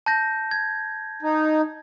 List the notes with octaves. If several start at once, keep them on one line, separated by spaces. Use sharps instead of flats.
A5 G6 A#6
G#6
D#4